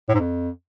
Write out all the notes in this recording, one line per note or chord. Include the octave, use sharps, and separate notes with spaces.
A2
G#2
F2